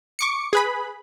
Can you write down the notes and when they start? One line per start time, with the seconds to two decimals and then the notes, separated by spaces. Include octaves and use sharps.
0.19 C#6 D6 C#7
0.53 G#4 B4 B5